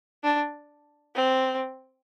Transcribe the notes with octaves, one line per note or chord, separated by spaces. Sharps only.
D4
C4